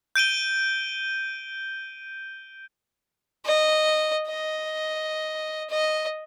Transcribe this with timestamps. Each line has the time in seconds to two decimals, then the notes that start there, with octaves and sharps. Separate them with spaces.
0.15 G6 D7 D#7 G7
3.45 D#5
4.28 D#5
5.70 D#5